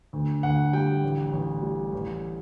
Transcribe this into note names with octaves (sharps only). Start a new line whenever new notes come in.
D2
D2 F#5
G3 G5
A1
A1
G3
A1